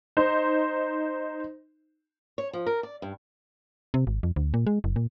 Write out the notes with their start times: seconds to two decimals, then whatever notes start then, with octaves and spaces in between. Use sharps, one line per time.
0.17 D#4 C5
2.38 C#5
2.53 F3
2.66 A#4
2.83 D5
3.02 G2
3.94 C3
4.07 G#1
4.23 F2
4.36 D2
4.54 A#2
4.67 G#3
4.84 F#1
4.96 A#2